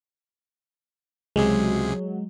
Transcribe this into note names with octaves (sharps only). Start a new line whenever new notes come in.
C#2 C3 F#3 G#3 G#4